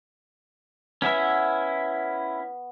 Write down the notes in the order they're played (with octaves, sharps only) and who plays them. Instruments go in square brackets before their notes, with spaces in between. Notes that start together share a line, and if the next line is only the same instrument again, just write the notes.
[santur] B3 [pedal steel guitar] C#4 E4 E5